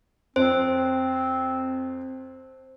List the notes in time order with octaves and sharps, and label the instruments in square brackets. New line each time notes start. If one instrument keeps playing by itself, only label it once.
[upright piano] F2 [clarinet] C4 [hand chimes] C5